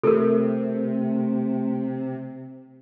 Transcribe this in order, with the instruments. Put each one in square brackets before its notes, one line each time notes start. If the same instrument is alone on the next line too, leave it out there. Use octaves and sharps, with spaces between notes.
[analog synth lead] C3 [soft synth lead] A3 [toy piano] A4 A#4